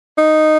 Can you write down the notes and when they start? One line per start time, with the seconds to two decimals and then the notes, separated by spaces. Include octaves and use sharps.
0.18 D#4